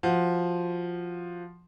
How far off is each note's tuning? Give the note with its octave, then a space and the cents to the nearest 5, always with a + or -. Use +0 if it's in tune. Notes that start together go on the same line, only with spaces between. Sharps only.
F3 +0 F#4 +0